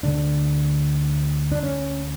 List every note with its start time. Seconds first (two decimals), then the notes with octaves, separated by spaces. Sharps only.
0.03 D2 D3 D4
1.52 D4
1.63 C#4